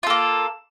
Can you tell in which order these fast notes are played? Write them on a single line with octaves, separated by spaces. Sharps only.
F4 A4 A#3